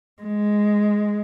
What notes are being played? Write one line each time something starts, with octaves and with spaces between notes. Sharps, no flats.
G#3